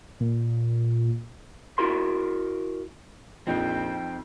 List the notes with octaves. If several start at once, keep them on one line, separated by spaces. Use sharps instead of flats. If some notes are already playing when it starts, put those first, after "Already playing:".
A#2
E4 F#4 A#4 C6
A#1 F2 F3 C4 D#4 G5